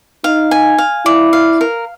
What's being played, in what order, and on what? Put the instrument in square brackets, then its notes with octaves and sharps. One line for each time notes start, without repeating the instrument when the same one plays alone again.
[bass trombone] D#4 [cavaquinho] F5
[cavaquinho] G#5
F5
[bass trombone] E4 [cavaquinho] D5
[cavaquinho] F5
A#4